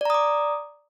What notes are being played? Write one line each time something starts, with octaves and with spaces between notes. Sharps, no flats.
D5 A#5 D6 D#6